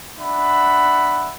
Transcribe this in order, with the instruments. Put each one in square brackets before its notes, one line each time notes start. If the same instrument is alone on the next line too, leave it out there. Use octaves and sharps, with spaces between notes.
[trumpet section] D4 E5 F#5 B5